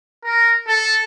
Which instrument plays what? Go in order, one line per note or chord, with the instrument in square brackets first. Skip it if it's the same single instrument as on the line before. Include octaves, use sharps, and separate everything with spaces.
[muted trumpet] A#4
A4